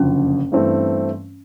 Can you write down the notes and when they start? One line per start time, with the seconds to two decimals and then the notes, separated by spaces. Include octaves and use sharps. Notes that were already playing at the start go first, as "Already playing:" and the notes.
Already playing: F#1 F2 D3 C#4
0.52 G2 E3 A3 C4